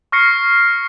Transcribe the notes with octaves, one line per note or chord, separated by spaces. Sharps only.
C#6 F6 A#6 C7 C#7